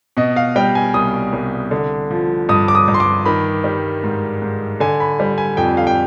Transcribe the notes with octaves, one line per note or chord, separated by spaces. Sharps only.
B2 D#5
F5
G3 G5
G#5
C2 D#6
C2
D3
F3
G2 D#6
D6
D#6
G2
C6
D6
D#3 B5
G3
G#2
G#2
D3 G#5
B5
G3
G#5
F2 G5
F5
G5